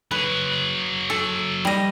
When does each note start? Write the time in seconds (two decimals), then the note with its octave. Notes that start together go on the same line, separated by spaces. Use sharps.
0.11 F#3 G#4 B4
1.10 A4
1.65 G3 D#5